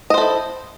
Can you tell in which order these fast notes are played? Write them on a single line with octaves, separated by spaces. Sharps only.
D#5 C5 A4 E4